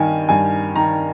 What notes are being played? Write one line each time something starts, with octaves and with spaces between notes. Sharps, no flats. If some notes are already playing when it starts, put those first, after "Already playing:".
Already playing: G2 D#3 G#5
G2 G#5
D#3 A#5